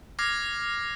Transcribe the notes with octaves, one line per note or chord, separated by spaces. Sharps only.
D6 F6 G#6 A#6 C7